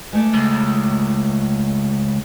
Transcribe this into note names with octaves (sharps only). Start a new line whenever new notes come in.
G#3 A3 D5
C#2